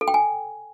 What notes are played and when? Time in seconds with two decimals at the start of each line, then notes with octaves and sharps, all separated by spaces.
0.01 A4
0.08 G5
0.14 G#5